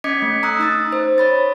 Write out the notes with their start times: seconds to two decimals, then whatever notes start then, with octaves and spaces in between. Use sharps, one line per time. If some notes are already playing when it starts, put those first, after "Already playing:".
0.04 C#4 D#5 D6 G#6 B6 C#7
0.22 A3
0.43 A#5 D#6 E6 F#6
0.59 D#4 D#6 A6
0.92 C5
1.18 C#5 B5 A6